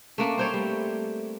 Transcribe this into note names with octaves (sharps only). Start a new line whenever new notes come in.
A3 A#3 C#4 D4
G3 C4 C5 C#5
G3 A3